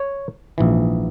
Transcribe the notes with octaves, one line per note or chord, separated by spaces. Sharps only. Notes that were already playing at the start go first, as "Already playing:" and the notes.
Already playing: C#5
A#1 G#2 E3